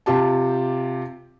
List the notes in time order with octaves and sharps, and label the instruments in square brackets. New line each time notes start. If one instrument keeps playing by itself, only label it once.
[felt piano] C3 F4 G4 A5